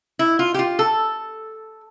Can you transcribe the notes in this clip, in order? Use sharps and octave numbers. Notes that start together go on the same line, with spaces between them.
E4
F4
G4
F4
A4